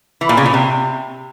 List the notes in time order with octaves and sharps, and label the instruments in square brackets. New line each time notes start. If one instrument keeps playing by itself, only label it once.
[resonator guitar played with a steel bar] E3
A#2
C#3
A#2
C3